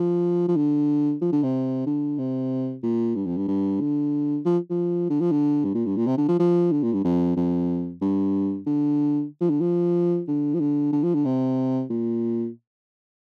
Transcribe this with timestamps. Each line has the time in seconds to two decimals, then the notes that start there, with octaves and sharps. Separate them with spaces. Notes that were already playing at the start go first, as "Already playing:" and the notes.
Already playing: F3
0.48 F3
0.57 D3
1.21 F3
1.33 D3
1.43 C3
1.86 D3
2.19 C3
2.83 A#2
3.16 G2
3.26 F2
3.37 G2
3.48 G2
3.81 D3
4.46 F3
4.70 F3
5.10 D3
5.21 F3
5.32 D3
5.64 G2
5.75 A#2
5.86 G2
5.97 A#2
6.07 C3
6.18 D3
6.29 F3
6.40 F3
6.72 D3
6.83 A#2
6.93 G2
7.05 F2
7.37 F2
8.02 G2
8.66 D3
9.41 F3
9.50 D3
9.61 F3
10.28 D3
10.55 F3
10.61 D3
10.93 D3
11.04 F3
11.14 D3
11.25 C3
11.90 A#2